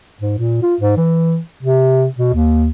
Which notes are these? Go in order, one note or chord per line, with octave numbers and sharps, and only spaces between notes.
G#2
A#2
F4
G#2
E3
C3
B2
D#2